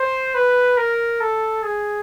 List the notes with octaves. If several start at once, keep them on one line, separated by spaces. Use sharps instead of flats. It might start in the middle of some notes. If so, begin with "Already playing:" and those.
Already playing: C5
B4
A#4
A4
G#4